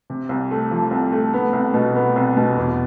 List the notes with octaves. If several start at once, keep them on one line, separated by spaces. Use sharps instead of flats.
C3
C2
A3
F3
C2
A3
B3
C2
B2
B3
C2
B2
E2